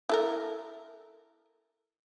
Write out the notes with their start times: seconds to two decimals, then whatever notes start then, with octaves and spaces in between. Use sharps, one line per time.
0.09 E4 A4 A#4